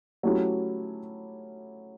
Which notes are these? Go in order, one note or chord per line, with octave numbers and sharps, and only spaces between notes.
F#3 A3 C#4 E4 G4